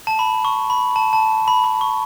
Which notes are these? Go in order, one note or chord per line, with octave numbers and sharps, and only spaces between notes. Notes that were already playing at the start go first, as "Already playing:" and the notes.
A5
B5
C#6
B5
A5
A5
B5
B5
C#6